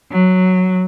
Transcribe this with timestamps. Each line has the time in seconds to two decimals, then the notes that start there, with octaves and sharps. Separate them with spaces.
0.11 F#3